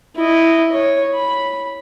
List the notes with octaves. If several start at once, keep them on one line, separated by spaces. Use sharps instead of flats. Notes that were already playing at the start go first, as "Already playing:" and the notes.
E4 D#5
C#5
B5